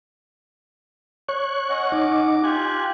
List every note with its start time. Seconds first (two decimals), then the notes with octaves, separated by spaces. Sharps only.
1.29 C#5 C#6 F#6
1.70 C#4 D#5 F#5
1.92 D#4 D6
2.44 F4 G4 G#5 F#6